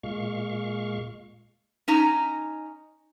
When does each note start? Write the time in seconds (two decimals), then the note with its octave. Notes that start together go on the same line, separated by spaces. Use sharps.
0.03 A#2 G#3 F5 C#6
1.88 C#4 D#4 A#5